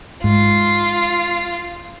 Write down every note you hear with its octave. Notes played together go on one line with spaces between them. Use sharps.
G#2 F4